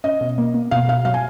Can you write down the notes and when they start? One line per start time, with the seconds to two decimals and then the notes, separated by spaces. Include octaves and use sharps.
0.04 C#4 D#5
0.21 B2
0.38 A#3
0.54 A#3
0.71 B2 F5
0.88 B2 F5
1.05 F#3 F5
1.14 G#5